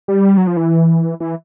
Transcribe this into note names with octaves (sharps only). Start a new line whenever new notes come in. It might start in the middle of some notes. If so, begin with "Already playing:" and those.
G3
F#3
F3
E3
E3